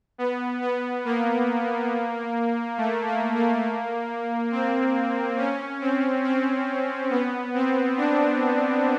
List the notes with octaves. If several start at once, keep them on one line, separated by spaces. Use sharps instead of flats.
B3
B3
A#3
A3
A#3
A#3
C4
C#4
C4
C4
B3
C4
D4